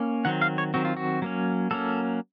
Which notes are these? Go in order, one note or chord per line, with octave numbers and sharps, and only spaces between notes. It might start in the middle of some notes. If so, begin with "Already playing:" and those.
Already playing: A#3 C#4
D#3 F#3 C4 F#5
F5
C#5
D#3 F#3 C4 F#4
F4
F#4
F#3 A#3 C#4
F#3 A#3 C#4 A4